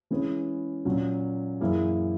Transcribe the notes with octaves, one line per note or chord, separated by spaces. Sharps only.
E3 G#3 C#4 G#4 B4
A#2 F#3 C#4
F#2 E3 A#3 E4 G#4